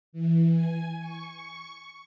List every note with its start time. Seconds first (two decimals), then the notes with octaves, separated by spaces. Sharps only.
0.12 E3
0.51 G#5
0.99 C#6